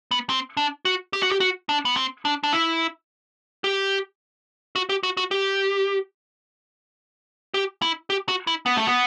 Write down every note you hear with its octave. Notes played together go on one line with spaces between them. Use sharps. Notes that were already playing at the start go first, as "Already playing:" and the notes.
B3
C4
D4
F#4
G4
F#4
G4
F#4
D4
B3
C4
D4
D4
E4
G4
F#4
G4
F#4
F#4
G4
G4
E4
G4
F#4
E4
B3
A3
B3